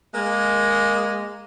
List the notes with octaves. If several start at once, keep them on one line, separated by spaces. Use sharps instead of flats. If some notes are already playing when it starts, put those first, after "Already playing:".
G#3 A#3